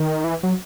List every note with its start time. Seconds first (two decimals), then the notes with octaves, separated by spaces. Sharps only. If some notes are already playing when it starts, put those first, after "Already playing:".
Already playing: D#3
0.24 E3
0.43 F#3